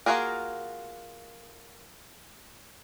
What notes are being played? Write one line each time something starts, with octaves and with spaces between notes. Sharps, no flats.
A#3 F4 F#4 G#4 A#4